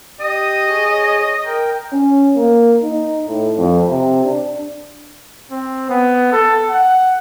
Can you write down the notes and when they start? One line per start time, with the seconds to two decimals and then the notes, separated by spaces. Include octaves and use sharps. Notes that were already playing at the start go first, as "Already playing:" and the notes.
0.20 G4 D#5 D#6
0.68 G#4 C#5
1.45 A#4 G5
1.92 C#4
2.36 A#3
2.83 D#4
3.28 A2
3.57 F2
3.89 C3
4.24 D4
5.51 C4
5.89 B3
6.32 A4
6.69 F#5